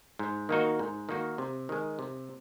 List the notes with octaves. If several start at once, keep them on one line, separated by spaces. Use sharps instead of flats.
G#2
D#3 A#3 D#4 F#4
G#2
D#3 A#3 D#4 F#4
C3
D#3 G#3
C3